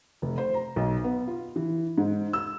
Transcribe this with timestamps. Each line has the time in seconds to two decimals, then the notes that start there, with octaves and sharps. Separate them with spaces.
0.22 F1
0.38 C5
0.54 A#5
0.76 B1
1.04 B3
1.27 F4
1.56 E3
1.98 G#2
2.33 E6